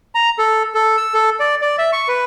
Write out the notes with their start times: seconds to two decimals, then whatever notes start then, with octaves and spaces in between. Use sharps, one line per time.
0.15 A#5
0.39 A4
0.75 A4
0.97 E6
1.14 A4
1.40 D5
1.62 D5
1.78 E5
1.93 C#6
2.08 B4